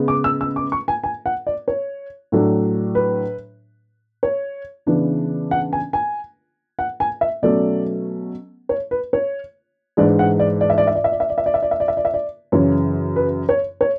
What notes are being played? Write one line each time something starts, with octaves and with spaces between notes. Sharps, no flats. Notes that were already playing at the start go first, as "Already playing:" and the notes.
Already playing: C#3 G#3 B3
D6
E6
E6
D6
C#6
G#5
G#5
F#5
D5
C#5
A2 F#3 A3 D4
B4
C#5
C#3 E3 B3 D4
F#5
G#5
G#5
F#5
G#5
E5
B2 F#3 A3 C#4 D5
C#5
B4
C#5
G#2 E3 G#3 D4 D5
F#5
D5
D5
E5
D5
E5
D5
E5
D5
E5
D5
E5
D5
E5
D5
E5
D5
E5
D5
E5
D5
F#2 C#3 E3 C#5
B4
C#5
C#5